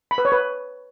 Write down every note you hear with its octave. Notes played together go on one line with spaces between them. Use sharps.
B5
B4
C#5
B4